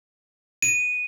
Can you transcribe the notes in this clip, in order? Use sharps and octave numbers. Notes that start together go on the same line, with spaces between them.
D#7